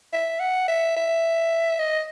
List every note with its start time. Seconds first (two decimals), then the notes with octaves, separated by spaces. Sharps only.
0.13 E5
0.40 F#5
0.68 E5
0.96 E5
1.79 D#5